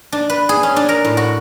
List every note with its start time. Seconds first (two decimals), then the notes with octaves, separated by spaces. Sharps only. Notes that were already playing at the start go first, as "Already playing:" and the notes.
0.13 D4
0.30 B4
0.49 G#4
0.63 C#4
0.76 D4
0.89 A#4
1.04 A2
1.17 F#4